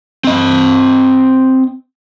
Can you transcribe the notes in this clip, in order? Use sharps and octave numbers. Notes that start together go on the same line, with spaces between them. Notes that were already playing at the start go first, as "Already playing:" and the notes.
C4 D#5